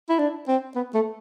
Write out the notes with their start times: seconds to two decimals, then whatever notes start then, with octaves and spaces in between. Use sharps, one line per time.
0.09 E4
0.19 D4
0.48 C4
0.75 B3
0.94 A3